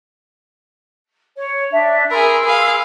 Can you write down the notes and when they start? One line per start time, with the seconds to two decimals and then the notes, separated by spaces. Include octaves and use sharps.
1.37 C#5
1.71 D4 E5
2.10 G#4 A#4 B5 C6 E6
2.44 G#4 F5